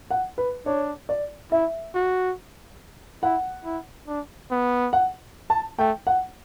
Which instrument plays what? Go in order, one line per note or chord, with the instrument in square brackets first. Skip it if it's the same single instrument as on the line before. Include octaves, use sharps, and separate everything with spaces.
[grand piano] F#5
B4
[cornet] D4 [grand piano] C#5
[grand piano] D5
[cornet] E4 [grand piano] E5
[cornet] F#4
[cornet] E4 [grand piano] F#5
[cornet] E4
D4
B3
[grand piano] F#5
A5
[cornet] A3 [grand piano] G5
[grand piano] F#5